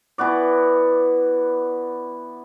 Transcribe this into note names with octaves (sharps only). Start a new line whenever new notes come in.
E3 B3 F#4 D5